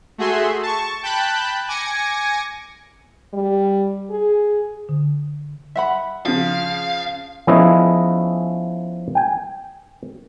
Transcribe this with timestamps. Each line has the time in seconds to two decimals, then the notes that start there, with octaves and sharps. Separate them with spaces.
0.18 A3 F#4 G#4 E5 C6
0.63 A5 C#6
1.03 G5 A5 B5 F#6 G6
1.68 G#5 D6 G#6 A#6 C#7
3.33 G3
4.10 G#4
4.89 D3
5.75 E5 F#5 B5
6.26 C#3 F3 F5
7.47 F3 B3 C#4 E4 G#4 D#5
9.15 G5 G#5